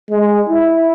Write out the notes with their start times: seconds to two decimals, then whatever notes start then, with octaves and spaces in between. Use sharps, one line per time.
0.10 G#3
0.48 E4